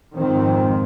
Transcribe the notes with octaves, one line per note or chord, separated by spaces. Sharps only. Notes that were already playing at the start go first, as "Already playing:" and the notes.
F2 G#2 D#3 C4